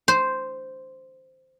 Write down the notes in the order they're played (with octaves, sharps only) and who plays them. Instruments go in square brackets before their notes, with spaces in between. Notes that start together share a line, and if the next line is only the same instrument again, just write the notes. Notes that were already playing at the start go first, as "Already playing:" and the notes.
[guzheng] C5